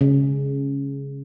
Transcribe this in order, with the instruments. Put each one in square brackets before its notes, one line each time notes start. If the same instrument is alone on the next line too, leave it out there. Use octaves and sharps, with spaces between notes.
[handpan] C#3